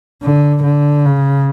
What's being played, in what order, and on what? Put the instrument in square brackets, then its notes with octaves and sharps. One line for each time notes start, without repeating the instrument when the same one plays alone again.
[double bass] D3
D3
C#3